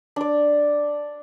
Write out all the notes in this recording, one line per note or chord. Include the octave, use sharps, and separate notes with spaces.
D4 D5